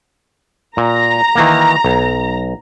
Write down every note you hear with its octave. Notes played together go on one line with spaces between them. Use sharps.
A#2 A#5
D#3 E3 A#3
B1